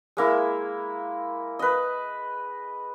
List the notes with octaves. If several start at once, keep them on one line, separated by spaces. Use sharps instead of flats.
G#3 A#3 E4
B4 D#5